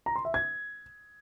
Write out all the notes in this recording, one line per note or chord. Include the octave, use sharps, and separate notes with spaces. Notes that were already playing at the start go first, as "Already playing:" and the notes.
A#5
C6
E5
G#6